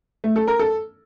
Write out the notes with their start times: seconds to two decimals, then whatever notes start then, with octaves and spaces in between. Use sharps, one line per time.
0.24 A3
0.36 A4
0.48 A#4
0.59 A4